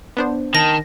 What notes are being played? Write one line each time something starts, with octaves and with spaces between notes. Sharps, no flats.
B3 D4 C5
D#3 A5 A#6